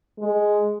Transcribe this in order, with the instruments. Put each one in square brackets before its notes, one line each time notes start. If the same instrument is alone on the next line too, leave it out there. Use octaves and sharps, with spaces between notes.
[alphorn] G#3